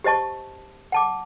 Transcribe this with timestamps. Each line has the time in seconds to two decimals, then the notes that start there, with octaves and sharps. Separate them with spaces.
0.04 G4 C5 D#5 A5 C#6
0.92 F#5 A5 D6